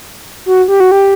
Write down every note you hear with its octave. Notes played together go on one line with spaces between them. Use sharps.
F#4
G4
F#4
G4